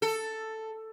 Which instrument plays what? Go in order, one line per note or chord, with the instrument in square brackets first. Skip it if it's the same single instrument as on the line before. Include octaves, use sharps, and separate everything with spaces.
[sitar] A4